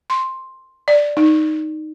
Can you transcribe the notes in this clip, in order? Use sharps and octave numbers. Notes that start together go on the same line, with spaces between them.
C6
D5
D#4